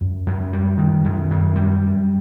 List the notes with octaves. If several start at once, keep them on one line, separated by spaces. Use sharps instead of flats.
F#2
F#2
G3
D#3
F#2
F#2
G3